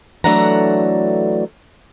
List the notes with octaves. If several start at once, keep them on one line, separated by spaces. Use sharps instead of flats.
E3 F#3 A3 D4 F#5 A#5